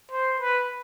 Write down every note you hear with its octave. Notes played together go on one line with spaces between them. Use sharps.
C5
B4